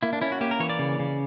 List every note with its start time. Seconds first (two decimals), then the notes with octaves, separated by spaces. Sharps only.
0.03 A#3 E4
0.13 D4
0.21 C#4 E4
0.32 F#4
0.41 A#3 G4
0.51 A#4
0.60 E3 C#5
0.69 D5
0.79 C#3
0.99 C#3